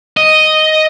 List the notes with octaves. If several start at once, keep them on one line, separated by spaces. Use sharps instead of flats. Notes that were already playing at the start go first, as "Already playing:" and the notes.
D#5